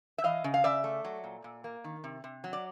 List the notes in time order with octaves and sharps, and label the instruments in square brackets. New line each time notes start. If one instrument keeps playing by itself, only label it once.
[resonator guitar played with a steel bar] E5
E3 D#5 F5
C#3
F5
C#3 D5 E5
A3
F#3
A#2
A#2
A#3
D#3
C3
C3
F#3
D5